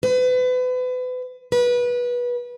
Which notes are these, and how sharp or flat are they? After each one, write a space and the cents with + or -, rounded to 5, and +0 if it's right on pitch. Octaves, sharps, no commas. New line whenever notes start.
B4 +35
B4 -25